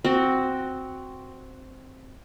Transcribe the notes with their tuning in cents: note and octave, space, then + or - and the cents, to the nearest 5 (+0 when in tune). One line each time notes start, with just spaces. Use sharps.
C4 +0 F#4 +5